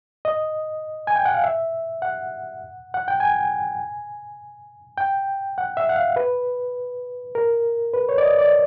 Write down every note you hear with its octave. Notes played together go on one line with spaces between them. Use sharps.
D#5
G#5
G5
F#5
F5
E5
F#5
F#5
G5
G#5
G5
F#5
E5
F#5
F5
B4
A#4
B4
C#5
D5
D#5
D5